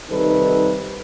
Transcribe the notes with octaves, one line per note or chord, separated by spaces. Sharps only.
C3 D#3 G3 D#4 A4 B4